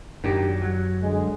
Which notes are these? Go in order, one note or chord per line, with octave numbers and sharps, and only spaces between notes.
F#2 D#3 D4 G4
F#3
D3 G#3